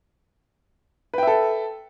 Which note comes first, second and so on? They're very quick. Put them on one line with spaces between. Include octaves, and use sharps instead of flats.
B4 G5 E5 A4